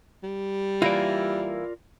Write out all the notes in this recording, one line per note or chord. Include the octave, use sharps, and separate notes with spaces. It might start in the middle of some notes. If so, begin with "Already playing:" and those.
G3
E3 A#3 E4 F4 A#4 D5